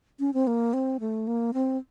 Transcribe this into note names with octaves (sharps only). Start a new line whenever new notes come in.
C#4
C4
A#3
C4
A3
A#3
C4